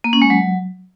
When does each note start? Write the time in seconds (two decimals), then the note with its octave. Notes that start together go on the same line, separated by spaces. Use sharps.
0.04 A#3
0.13 C#4
0.22 G#3
0.30 F#3